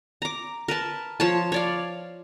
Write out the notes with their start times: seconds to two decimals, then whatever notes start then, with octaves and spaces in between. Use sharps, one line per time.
0.22 A#5 D6
0.68 A#4 B4 A5
1.20 F3 C#5 A5
1.52 C#5 D5 F5